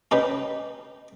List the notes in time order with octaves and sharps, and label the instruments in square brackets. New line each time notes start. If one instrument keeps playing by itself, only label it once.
[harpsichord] C#4 D#4 G4 B4